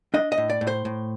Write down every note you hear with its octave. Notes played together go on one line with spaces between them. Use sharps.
D4 D#5
D#5
A2
D5
A2
C5
A2